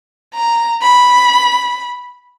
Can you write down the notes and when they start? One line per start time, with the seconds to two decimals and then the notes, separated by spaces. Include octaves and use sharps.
0.34 A#5
0.82 B5